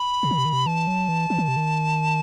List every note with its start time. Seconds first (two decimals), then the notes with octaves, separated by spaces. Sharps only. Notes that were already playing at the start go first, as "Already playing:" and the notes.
Already playing: B5
0.23 C3
0.31 D#3
0.38 C3
0.45 D#3
0.53 C3
0.66 E3 A5
0.87 F#3
1.09 E3
1.30 E3
1.38 D#3
1.48 C3
1.57 D#3